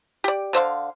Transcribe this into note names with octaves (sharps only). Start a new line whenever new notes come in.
G4 D5
D3 C5 E5 F5